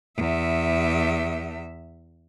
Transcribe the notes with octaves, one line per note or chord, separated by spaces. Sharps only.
E2 E5